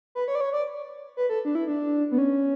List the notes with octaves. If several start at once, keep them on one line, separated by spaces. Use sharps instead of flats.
B4
C#5
D5
C#5
D5
B4
A4
D4
E4
D4
B3
C#4